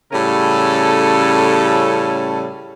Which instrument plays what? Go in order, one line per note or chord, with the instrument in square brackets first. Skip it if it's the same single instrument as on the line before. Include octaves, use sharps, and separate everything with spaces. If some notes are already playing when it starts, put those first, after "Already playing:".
[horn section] A2 C#3 G3 C#4 A4